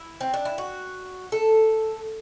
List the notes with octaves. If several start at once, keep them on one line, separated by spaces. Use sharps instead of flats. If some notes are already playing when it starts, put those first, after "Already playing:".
Already playing: E4
C4
D4
E4
F#4
A4